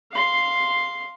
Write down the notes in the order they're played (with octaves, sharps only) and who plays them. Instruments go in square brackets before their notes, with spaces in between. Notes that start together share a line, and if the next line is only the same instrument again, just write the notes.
[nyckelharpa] F5 C6